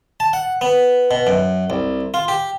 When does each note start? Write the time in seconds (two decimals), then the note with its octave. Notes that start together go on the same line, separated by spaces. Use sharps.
0.20 A5
0.33 F#5
0.61 B3
1.11 B2
1.27 F#2
1.70 C2
2.14 F4
2.28 G4